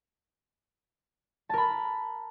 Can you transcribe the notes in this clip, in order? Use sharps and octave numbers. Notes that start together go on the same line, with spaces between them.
A#4 A5 B5